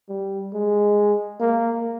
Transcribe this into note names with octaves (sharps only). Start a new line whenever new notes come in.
G3
G#3
A#3